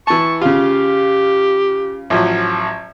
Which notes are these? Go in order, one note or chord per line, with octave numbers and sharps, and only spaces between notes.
E3 A5 C#6
C#3 F4 G4
A1 F3 F#3